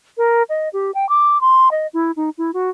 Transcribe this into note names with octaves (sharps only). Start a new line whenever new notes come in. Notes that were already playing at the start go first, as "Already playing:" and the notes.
A#4
D#5
G4
G5
D6
C6
D#5
E4
D#4
E4
F#4